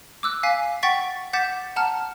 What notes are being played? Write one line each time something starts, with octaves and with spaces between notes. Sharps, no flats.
D6 E6 F#6
F5 G#5 B6
F#5 G5 C#6 A6 B6
F#5 D6 G6 A6 B6 E7
F#5 A5 A#5 F6